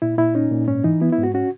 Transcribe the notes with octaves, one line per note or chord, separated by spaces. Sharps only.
A#2 E4
A#2 E4
C#4 D#4
A#2
G#2 C#4
E3 D#4
B3 E4
E4
G#2
F#4
C#4 F#4